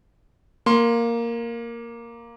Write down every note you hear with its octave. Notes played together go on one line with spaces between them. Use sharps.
A#3 C6